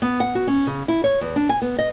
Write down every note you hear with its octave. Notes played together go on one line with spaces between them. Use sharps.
B3
F#5
F#4
C#4
C#3
E4
C#5
E2
D4
G#5
B3
D#5